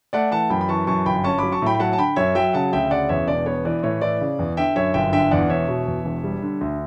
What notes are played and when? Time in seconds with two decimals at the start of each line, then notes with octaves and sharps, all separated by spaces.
0.13 A3 D5 F#5
0.31 E3 F#5 A5
0.50 F#2 G5 B5
0.61 B5
0.69 E3 A5 C#6
0.87 F#2 A5 C#6
1.06 G1 G5 B5
1.24 C#4 A5 C#6
1.38 F#3 B5 D6
1.52 A5 C#6
1.62 A2 G5 B5
1.75 B5
1.79 F#3 F#5 A5
1.93 A5
1.98 D3 G5 B5
2.16 F#2 C#5 E5
2.35 F#3 E5 G5
2.53 C#3 F#5 A5
2.73 D2 E5 G5
2.91 C#3 D5 F#5
3.09 E2 C#5 E5
3.28 E1 D5
3.46 B3 C#5
3.65 E3 D5
3.83 A2 C#5
4.01 E3 D5
4.20 C#3
4.39 E2
4.57 D3 E5 G5
4.75 F#2 C#5 E5
4.94 G1 E5 G5
5.12 D3 E5 G5
5.31 E2 D5 F#5
5.50 E1 C#5 E5
5.69 B2
5.87 E2
6.05 E1
6.24 G3
6.42 D3
6.61 D2